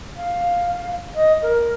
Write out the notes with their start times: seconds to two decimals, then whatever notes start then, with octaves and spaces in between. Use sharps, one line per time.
0.16 F5
1.15 D#5
1.42 A#4